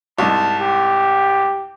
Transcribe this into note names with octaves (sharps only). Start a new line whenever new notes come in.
C2 G#2 A5
G4